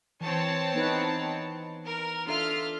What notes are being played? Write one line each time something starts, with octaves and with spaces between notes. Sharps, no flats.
E3 C4 C#5 A5
B3 D#4 B4
A#4
D4 F4 A4 E5 F6